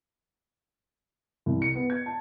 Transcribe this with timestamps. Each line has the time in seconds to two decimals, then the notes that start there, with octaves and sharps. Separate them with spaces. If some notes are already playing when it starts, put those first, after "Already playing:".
1.46 C2
1.62 C#7
1.76 B3
1.90 G#6
2.06 A5